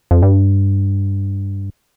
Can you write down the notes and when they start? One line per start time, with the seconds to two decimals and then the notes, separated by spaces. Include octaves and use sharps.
0.11 F2
0.22 G2